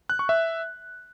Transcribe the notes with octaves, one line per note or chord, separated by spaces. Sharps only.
F#6
C#6
E5